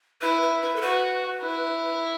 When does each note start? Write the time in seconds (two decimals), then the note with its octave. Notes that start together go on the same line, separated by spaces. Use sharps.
0.22 E4 B4
0.42 B4
0.62 B4
0.76 A4
0.81 F#4 B4
1.43 E4